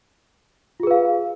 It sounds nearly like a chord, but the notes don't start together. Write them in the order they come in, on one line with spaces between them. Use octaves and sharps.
F4 G#4 B4 F5